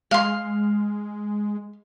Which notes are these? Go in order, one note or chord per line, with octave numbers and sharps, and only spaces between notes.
G#3 F5 C6